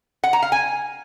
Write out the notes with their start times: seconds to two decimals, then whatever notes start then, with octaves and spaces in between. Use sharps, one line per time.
0.24 F#5
0.33 A#5
0.42 F5
0.52 G#5